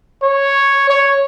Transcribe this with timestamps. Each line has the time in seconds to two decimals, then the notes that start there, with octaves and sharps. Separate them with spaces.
0.23 C#5
0.90 C#5